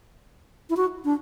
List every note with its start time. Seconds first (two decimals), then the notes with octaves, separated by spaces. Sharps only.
0.70 E4
0.77 F#4
1.05 D4